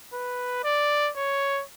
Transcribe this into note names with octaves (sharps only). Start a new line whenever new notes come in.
B4
D5
C#5